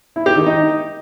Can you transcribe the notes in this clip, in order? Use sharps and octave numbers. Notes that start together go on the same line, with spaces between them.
E4
G4
D#3
D#4